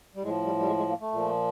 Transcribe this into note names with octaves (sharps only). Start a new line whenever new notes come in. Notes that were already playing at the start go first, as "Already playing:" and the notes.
G3
A2 F3 G#3
G3
G3
G#3
G#3
A#3
A3
A#2 F3